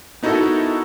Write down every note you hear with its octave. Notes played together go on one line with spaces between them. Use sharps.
B3 D#4 E4 F#4 A4 A#4